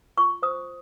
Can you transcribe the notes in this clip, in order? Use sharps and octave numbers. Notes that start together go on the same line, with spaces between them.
F4 C#6
C5 D#6